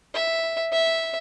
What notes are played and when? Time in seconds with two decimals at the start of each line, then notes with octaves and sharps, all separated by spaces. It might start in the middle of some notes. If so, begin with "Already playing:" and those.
0.14 E5
0.72 E5